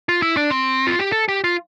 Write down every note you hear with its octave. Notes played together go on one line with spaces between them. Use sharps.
F4
E4
D4
C4
F4
G4
A4
G4
F4